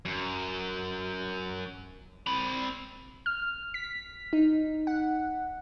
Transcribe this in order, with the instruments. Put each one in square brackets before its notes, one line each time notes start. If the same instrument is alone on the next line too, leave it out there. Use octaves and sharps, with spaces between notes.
[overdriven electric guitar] F#2
C4 B5
[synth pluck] F6
B6
D#4
F#5